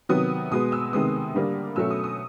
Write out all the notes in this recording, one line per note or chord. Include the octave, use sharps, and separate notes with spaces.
C3 D#3 F#3 B3 D#6
B2 G#3 B3 D#6
E6
C3 D#3 G#3 B3 D#6
D3 G3 A#3 D4
B2 F#3 A3 C#4 E6
D#6
D#6